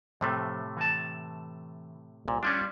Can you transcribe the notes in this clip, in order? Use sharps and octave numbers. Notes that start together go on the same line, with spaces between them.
A2 C3 F3 A3
E3 A5
C2 A#2
G3 C#4 D4 F4